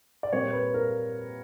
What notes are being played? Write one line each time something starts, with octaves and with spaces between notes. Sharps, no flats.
D5
A#2 G3 C4 C#5
B4
A#4